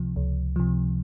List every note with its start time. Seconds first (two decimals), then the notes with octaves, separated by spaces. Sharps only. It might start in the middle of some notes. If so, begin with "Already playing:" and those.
Already playing: C#2 C3 F3
0.16 C#2
0.56 C3 F3